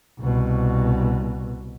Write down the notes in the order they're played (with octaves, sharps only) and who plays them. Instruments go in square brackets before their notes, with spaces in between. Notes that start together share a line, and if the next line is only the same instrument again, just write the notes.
[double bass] C2 B2